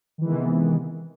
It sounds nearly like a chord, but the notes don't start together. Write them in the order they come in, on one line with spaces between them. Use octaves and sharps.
D#3 E3 G#3 B3 C3